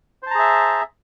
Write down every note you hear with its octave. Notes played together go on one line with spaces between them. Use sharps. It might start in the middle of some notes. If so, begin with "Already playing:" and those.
G#4 C5 E5 A5 A#5